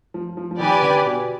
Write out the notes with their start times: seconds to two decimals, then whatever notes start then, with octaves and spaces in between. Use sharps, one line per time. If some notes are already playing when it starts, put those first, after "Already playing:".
0.14 F3
0.37 F3
0.51 F3
0.60 D#3 G4 B4 D5 G#5
0.82 D3
1.05 B2